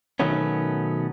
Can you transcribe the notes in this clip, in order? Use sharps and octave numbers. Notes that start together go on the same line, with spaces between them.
B2 D#3 F#3 A3 B3 C#4